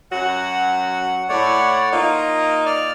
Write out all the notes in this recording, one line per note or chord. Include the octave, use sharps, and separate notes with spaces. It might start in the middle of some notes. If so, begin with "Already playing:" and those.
F#2 F#3 F#4 F#5
A2 A3 C#5 D5 F#5
A#3 D#4 F4
A#5
D5 F6